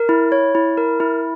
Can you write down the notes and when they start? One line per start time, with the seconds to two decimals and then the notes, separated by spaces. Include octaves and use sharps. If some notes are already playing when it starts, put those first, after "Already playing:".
Already playing: A#4
0.09 E4
0.32 C#5
0.55 E4
0.78 A#4
1.00 E4